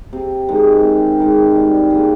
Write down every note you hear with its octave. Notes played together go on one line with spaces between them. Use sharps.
C3
D#3 G#3
C3
D#3 G#3
G3
A#3 F4 G#4